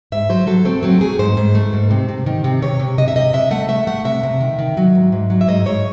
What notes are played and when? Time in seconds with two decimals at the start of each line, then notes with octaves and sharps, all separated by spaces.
0.12 G#2 E5
0.29 F#3 C5
0.47 F#3 A4
0.65 A3 C4
0.83 F#3 C4
1.01 A3 G#4
1.19 G#2 C5
1.37 G#2
1.55 A3
1.73 G#2
1.90 C3
2.09 C3
2.26 D#3
2.44 C3
2.62 C3 C#5
2.79 C3
2.98 C3 D#5
3.08 E5
3.16 C3 D#5
3.33 C3 E5
3.51 A3 F#5
3.69 A3 E5
3.87 A3 F#5
4.05 C3 E5
4.23 C3
4.40 D#3
4.59 D#3
4.77 F#3
4.95 G#2
5.12 G#2
5.30 F#3
5.41 E5
5.48 G#2 D#5
5.66 G#2 C#5